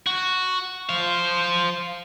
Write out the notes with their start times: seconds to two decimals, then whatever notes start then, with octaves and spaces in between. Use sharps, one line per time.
0.07 F#4
0.89 C5 F5